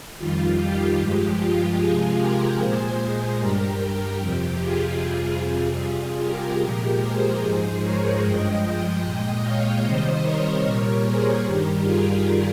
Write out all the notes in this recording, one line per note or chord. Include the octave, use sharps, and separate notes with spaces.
F2 D#3 G3 F4
G4
G2 F3 G#3
F4
C3 F3 G#3 F4 G#4
G4 A#4
A#2 G#3 G#4 C5
G2 G3 G4 A#4
G4
F2 C3 F3
F4 G#4
F2 C3 G3
F4 G#4
C3 G3
G4 A#4
A#2 F3 G#3
G#4 C5
G#2 F3 G#3 G#4 C5
A#4 C#5
G2 F3 G#3 D#5 G5
D#5 G5
A#2 G#3
C#5 F5
C3 D#3 G3 C5 D#5
A#4 C#5
A#2 G3
G#4 C5
G2 D#3 G3 G4 A#4
F4 G#4